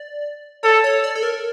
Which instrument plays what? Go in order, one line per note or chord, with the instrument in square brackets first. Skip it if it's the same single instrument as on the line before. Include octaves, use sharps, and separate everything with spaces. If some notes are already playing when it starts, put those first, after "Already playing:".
Already playing: [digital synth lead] D5
[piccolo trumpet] A4 [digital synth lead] C#5
[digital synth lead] C#5
D5
A4
A#4